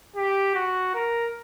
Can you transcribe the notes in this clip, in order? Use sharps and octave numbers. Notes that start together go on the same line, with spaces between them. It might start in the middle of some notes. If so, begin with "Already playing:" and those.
G4
F#4
A#4